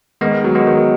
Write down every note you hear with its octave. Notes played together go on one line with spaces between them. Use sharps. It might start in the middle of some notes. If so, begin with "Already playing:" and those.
D#3 G#3 B3
F#3
G#3 B3
D#3